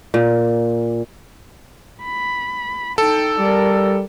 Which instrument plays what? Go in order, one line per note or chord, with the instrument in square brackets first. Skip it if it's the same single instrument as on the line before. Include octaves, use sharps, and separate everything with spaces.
[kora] A#2
[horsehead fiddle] B5
[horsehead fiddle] D#4 G5 [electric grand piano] A4
[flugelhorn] G3 [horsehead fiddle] A#4 D5